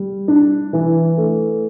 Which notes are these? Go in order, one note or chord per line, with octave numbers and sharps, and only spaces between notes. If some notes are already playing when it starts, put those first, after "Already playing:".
Already playing: G3
D4
E3
A3